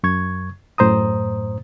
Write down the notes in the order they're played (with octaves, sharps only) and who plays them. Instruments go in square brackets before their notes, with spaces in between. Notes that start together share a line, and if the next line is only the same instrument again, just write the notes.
[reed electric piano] F#2 C#6 G#6
F#2 A2 C5 A#5 D#6